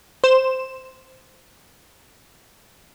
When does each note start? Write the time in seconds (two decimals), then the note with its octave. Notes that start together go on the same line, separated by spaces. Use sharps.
0.24 C5 E7